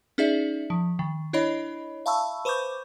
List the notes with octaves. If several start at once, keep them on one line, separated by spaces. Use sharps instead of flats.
C#4 D#4 G#4 D5 E5
F3
D#3
D4 E4 C#5 D#5 B5
E5 F5 A5 B5 C#6 E6
B4 C5 B5 C#6 D6 G6